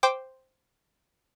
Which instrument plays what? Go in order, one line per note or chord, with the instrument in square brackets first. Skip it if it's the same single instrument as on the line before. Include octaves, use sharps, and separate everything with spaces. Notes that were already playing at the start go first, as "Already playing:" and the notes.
[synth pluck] C5 G5 D6